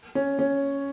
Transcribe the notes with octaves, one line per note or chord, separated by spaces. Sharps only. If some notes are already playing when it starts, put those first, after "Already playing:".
C#4
C#4